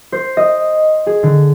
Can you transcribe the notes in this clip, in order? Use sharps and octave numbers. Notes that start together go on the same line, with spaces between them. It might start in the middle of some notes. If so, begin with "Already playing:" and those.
C5
D#5
G#4
D3